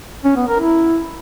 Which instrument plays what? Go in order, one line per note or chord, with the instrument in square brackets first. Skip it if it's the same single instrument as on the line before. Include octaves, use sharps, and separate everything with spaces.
[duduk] C#4
B3
A#4
E4